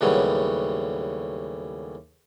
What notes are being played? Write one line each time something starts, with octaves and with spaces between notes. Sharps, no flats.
D#2 A2 C#3 F#3 G3 B3